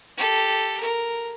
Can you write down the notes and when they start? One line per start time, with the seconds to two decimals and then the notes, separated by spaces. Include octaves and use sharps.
0.17 G4 A4
0.80 A#4